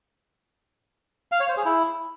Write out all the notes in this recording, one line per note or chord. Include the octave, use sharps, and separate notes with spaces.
F5
C#5
C5
G#4
E4